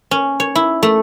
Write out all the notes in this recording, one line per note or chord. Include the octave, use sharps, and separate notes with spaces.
C#4
C#5
E4
A3